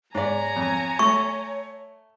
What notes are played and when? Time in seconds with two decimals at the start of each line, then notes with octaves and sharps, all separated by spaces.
0.15 G#2 C#5 D5 G#5 A#5
0.56 F2
0.99 A3 C#6